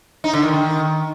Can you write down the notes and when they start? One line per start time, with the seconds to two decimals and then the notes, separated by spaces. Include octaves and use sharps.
0.24 D#4
0.33 D3
0.43 D#3